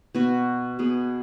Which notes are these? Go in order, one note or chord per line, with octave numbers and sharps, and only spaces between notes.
B2 B3 F#4 B4
B2 B3 G#4